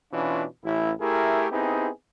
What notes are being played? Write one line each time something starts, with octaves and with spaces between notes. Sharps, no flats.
B2 E3 C#4 D4 F4
A1 E4
A3 E4 G4 G#4 A#4
B3 C4 D#4 E4 G4 G#4